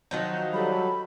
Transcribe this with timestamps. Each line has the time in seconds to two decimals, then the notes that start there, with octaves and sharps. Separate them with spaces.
0.11 D#3 F3 F#3 D#4 F#5
0.53 F#3 G3 A4 B5